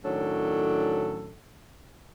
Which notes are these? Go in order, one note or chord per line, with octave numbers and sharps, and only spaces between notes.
A2 D#3 F#3 C#4 D4 A4